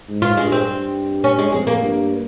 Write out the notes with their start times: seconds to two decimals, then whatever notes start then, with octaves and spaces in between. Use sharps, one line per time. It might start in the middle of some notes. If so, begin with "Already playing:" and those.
0.09 G#2
0.22 F4
0.37 G2 G#3
0.52 C4
0.66 G2
1.24 C#4
1.39 G#3
1.52 F2 G#3
1.67 A#3
1.82 G2